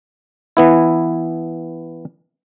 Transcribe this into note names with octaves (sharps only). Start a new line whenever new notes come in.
E3 B3 E4